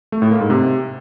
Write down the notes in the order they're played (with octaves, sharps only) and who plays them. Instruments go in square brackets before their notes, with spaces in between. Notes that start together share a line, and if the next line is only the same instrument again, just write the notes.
[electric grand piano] A3
A2
A#3
G#2
C3